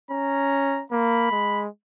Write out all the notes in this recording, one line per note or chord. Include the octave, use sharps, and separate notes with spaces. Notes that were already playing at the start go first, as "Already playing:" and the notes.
C#4 A#5
A#3 B5
G#3